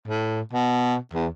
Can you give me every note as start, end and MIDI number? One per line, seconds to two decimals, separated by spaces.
0.08 0.41 45
0.53 0.96 47
1.13 1.28 40